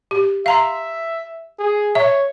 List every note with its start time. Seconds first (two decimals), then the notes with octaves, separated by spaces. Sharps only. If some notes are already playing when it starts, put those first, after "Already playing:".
0.11 G4
0.46 E5 F5 A#5 C6
1.59 G#4
1.95 C#5 E5